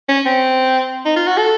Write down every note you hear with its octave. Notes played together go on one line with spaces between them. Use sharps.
C#4
C4
D#4
F4
F#4
A4